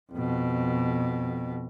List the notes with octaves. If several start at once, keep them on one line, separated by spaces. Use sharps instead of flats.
F2 B2